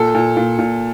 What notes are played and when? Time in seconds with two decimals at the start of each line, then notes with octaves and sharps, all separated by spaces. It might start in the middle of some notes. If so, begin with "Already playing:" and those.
Already playing: A#2 A4
0.14 A#2
0.37 A#2
0.59 A#2